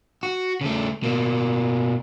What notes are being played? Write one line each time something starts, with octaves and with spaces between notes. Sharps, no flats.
F#4
C#3 A3
B2 A#3